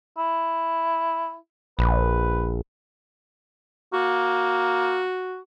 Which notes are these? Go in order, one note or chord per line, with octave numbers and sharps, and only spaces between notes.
E4
A#1 B4
A#3 F#4